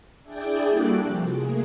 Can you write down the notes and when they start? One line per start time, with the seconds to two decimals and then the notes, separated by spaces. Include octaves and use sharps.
0.23 D4 E4 G#4 D5 G5
0.68 G3 A#3 F#4 A4 D6 F#6
1.02 C3 F3
1.33 A3 A#3 G#4